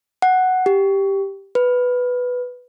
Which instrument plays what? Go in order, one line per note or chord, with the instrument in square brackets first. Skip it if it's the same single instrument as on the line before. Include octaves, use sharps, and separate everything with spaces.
[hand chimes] F#5
G4
B4